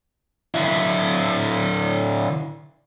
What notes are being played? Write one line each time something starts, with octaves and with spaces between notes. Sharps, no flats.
D3 E4